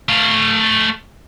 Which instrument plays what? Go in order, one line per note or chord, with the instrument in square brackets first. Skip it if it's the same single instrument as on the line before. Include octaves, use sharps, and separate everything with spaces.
[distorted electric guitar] A3 F5